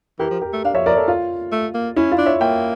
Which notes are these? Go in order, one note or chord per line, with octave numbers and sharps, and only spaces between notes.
E3 G4 A#4
F3
G4 A#4
A3
D4 F5
F3 C#5 E5
F3 A#4 D5
A4 C#5
F4
A3
A#3
C#4 E4
F4
D4
C#5 E5
A#3 E5 G5